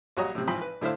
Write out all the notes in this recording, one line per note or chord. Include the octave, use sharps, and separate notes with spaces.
A#1 G3 F#4 C#5 D#5 A#5
A2 C3
G#1 E3 F3 G5 B5 C6
B4
A2 D3 E4 C5 F5